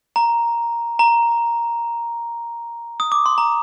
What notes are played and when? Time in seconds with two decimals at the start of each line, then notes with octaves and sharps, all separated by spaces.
0.16 A#5
0.99 A#5
3.00 D#6
3.12 D6
3.26 C6
3.38 A#5